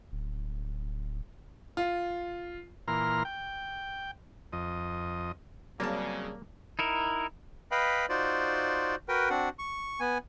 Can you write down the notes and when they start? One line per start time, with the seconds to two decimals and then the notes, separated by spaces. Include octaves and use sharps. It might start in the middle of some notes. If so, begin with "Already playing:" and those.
0.12 D1
1.77 F4
2.88 A#2 E3 A#5 C6 F6
3.25 G5
4.53 F2 D#5
5.80 C#3 F#3 G3 A#3 C4 A5
6.79 D#4 E4 A#4
7.71 B4 D#5 F5 G5 B5
8.09 D#4 F4 F#4 C5 D5
9.08 F#4 A#4 B4 G5
9.30 C4 D4 F#4 F#5
9.59 C#6
10.00 B3 G#5